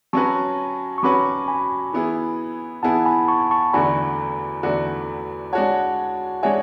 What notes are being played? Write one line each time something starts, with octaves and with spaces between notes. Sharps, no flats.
F#3 C#4 F#4 B4 A5 C#6
C#6
F#3 C#4 F#4 B4 B5 D6
G#5 B5
E3 B3 E4 G#4
E3 B3 E4 G#4 F#5 A5
G#5 B5
A5 C#6
A5 C#6
E2 D3 A3 D4 F#4 G#5 B5
E2 D3 A3 D4 F#4
G#3 D4 F#4 C#5 F#5 A5
G#3 D4 F#4 C#5 E5 G#5